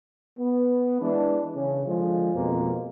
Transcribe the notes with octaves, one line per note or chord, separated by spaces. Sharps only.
B3
E3 G#3 D4
C#3
D3 F3 G#3
F2 B2 G#3 A#3